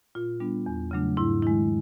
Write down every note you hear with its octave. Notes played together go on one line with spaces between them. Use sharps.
A#2 F4
G3 B3 D4
E2
C#3 F#3 A3 D4
G#2 E4
D#3 G#3 E4